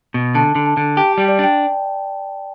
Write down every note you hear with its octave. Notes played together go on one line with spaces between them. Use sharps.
B2
D3 A5
D3
A5
D3
G4 A5
G3 G5
D5
D4 G5